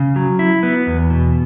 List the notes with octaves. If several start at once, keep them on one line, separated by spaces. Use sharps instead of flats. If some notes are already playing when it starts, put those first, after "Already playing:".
Already playing: C#3
F#3
E4
B3
E2
B2